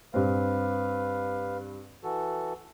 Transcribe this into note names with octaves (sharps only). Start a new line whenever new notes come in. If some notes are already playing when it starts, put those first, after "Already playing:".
G2 C4 B4 F5
E3 F#4 A4